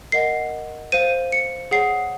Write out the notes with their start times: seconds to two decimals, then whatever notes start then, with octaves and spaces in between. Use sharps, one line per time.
0.12 A#4 D#5 F#5 C7
0.92 C5 F5 D#7
1.32 C#7
1.71 G#4 C#5 F#5 C7